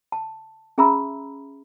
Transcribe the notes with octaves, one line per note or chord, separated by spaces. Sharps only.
A5
C#4 G#4 E5 A#5 B5 E6